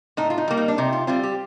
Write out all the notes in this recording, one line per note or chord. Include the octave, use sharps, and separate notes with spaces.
A2 D#4
F4
D#4
G3 A#3
D#4
D4
C3 D#4
F4
G3 C4 F4
G4